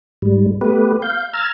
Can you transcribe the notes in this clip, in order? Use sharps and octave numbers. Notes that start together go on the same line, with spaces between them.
G#2 G3
A3 B3 G4 B4
F5 G6
A#5 E6 F6 G#6 A6